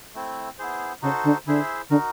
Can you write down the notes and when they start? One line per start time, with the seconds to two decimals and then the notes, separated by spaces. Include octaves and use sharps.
0.14 A3 C4 E4
0.58 B3 E4 G#4 C5
1.02 C#3 D#4 F#4 A4 C5
1.24 D3
1.46 D3 E4 G#4 C5 E5
1.90 D3 D#4 F#4 A#4